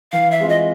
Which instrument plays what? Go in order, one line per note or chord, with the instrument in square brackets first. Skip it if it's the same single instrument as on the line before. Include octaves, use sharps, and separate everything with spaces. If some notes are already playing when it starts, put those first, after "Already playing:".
[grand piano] E3 [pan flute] F5
[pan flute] E5
[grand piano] G#3 C4 F4
[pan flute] D#5